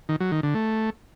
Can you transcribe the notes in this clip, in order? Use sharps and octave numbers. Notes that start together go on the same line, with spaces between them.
D#3
F#3
D#3
D3
A3